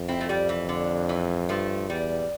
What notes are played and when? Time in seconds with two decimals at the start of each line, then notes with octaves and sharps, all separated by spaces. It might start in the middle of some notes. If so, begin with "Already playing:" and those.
Already playing: F2
0.08 C4 E4
0.21 A3
0.29 G3
0.49 E3
0.69 D3
1.09 E3
1.49 G2 F3 A3
1.90 E2 G3